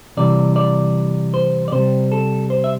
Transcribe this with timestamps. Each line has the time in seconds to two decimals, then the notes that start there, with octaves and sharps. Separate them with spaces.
0.17 C3 E3 G3 D5
0.56 D5
1.34 C5
1.68 D5
1.72 C3 G3 C5
2.12 A4
2.50 C5
2.64 E5